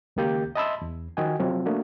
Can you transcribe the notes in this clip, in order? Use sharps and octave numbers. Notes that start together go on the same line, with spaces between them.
C#2 D#3 A#3 G4 G6
D#5 E5 A5 B5 C6 E6
E2
D#3 F3 F#4 D#5 G5 G#5
C3 F3 F#3 C4
A3 A#3 D4 F#4